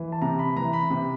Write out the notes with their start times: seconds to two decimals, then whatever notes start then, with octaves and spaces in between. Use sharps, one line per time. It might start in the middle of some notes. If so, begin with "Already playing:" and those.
Already playing: E3
0.12 A5
0.22 C3 A#5
0.39 B5
0.56 E3 A#5
0.73 B5
0.90 C3